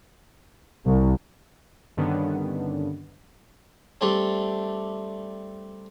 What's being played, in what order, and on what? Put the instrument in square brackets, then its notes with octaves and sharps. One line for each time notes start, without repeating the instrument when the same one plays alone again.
[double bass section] C2
[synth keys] G2 D3 D#3 B3 C#4 D4
[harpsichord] G3 A3 C4 D4 A4